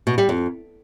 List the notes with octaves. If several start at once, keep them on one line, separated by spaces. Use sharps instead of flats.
B2
G3
F2